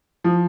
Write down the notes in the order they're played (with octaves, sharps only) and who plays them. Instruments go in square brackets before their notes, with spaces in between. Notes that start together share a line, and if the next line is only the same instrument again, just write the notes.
[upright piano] F3